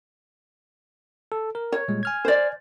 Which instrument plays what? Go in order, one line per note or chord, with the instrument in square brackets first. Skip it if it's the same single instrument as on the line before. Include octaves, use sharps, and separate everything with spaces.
[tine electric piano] A4
A#4
[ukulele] C#5
[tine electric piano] A#2 G3 G#3
G#5 F6 G#6
[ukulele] C5 D5